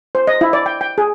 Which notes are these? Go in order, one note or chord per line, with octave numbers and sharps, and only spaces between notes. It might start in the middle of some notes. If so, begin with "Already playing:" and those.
C5
D#5
E4
D5
G5
G5
G#4